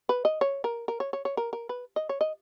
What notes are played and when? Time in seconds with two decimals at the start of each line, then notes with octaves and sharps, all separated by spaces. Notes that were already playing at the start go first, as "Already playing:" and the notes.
0.09 B4
0.25 D#5
0.41 C#5
0.64 A#4
0.88 A#4
1.00 C#5
1.13 C#5
1.25 C#5
1.37 A#4
1.53 A#4
1.69 B4
1.96 D#5
2.09 C#5
2.21 D#5